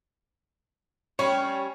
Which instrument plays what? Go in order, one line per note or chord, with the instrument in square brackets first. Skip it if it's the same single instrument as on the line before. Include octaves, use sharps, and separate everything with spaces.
[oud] G3 [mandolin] C#4 [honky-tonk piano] C#5